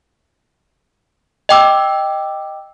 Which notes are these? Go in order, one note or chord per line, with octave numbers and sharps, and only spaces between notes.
D#5 G5 D6 E6